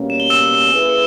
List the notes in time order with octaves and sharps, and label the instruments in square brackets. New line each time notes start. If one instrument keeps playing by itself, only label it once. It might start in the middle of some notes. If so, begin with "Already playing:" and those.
Already playing: [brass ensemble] B2 G3 A#3 C#4
[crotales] E7
G7
E6 E7
[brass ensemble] A#3 C#4 E4 G#4 B4